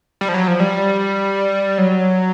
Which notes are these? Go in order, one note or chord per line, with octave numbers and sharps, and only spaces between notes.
G3
F3
F#3
F3
G3
F#3